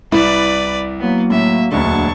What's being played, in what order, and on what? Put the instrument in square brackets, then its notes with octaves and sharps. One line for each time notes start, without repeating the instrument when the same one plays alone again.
[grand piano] C2 [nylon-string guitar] E4 [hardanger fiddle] B4 D5
[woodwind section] F#3 A#3 [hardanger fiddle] B3
[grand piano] A2 [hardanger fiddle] E5
[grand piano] E1 D2 D3 [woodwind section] F#3 A#3 D4 [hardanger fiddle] A5 C#6